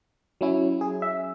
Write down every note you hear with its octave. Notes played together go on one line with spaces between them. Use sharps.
F#3 C#4 E4
G#4
E5